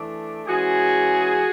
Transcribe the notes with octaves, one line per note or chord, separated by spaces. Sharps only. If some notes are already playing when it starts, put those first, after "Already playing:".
Already playing: E3 A3 D4
E3 G#3 C#4 F#4 G#4